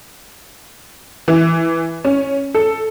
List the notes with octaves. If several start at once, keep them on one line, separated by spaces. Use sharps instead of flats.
E3
C#4
A4